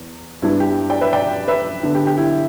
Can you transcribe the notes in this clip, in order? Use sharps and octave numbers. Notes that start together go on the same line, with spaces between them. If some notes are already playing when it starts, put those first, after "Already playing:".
Already playing: E2
G2 G3 B3 D4 E4
G4
D5 G5
B4 E5
D5 G5
B4 E5
D3 B3 D4
G4
G4
E4